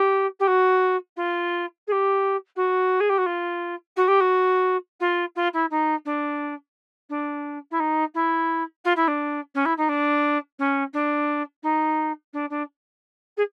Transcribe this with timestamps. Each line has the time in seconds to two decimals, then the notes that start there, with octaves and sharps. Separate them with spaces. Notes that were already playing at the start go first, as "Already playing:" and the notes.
Already playing: G4
0.39 G4
0.47 F#4
1.16 F4
1.87 G#4
1.91 G4
2.56 F#4
3.00 G#4
3.09 G4
3.18 F#4
3.26 F4
3.96 F#4
4.07 G4
4.20 F#4
5.00 F4
5.36 F4
5.53 E4
5.70 D#4
6.05 D4
7.09 D4
7.71 E4
7.79 D#4
8.14 E4
8.84 F4
8.96 E4
9.07 D4
9.54 C#4
9.65 E4
9.77 D#4
9.89 D4
10.59 C#4
10.93 D4
11.63 D#4
12.33 D4
12.50 D4
13.37 G#4